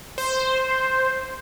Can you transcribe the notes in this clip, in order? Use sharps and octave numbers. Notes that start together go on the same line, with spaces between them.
C5